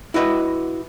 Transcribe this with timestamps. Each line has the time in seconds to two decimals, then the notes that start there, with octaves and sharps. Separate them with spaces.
0.14 E4 F#4 B4 D#5